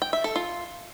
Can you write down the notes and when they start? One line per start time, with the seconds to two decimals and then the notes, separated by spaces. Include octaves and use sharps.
0.02 G5
0.13 E5
0.24 A4
0.36 F4